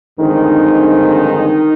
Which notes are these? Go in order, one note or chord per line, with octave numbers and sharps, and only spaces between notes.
G2 D3 D#3 F3 G#3 C4 D#4